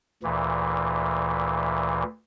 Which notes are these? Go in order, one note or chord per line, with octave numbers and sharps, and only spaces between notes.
D2 A#2 E3